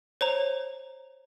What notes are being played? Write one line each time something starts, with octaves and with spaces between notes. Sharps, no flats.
C5 C#5 A#5